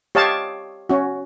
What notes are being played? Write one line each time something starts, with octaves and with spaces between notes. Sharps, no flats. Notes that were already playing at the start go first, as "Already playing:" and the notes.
G4 C#5 D#5 F5 A5
C#4 F#4